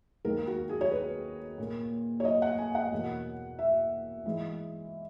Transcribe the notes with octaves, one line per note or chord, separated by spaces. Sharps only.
D#2 D#3 G#3 A#4
F#4
G#4
C#5
B4
A#2 A#3
C#5
D#5
F#5
G#5
F#5
E2 B2 A#3
E5
G#2 E3 G#3